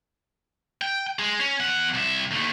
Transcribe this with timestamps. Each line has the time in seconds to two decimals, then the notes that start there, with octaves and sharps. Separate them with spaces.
0.82 G5
1.19 G#3
1.40 C#4
1.60 E2 F#5
1.94 C2 E5
2.31 D#2 A3